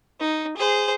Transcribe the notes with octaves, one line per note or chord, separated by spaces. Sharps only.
D#4
G#4 C5